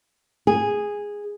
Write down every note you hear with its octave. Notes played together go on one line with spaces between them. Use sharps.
G#4